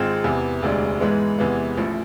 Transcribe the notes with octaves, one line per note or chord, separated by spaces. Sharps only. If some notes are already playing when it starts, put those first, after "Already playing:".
Already playing: G#1 G#2 G#3 C4 F4
E2 C3 E3
E1 D2 C3 G#3 D4
G#2 E3 G#3 B3
E2 C3 E3 G#3 B3
A1 A2 F3